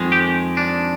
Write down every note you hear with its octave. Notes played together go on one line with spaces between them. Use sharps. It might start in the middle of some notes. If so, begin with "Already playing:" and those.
Already playing: F2 D#3 G#3
G4
D4